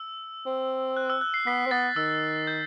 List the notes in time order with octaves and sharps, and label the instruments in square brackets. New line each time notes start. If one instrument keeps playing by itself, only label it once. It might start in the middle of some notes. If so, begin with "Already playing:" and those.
Already playing: [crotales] E6
[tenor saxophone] C4
[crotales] F#6
E6
F#6
C7
[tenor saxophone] B3 [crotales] B6
[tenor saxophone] C4
[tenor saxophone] B3 [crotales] A6
[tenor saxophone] D#3 [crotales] E6
[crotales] G6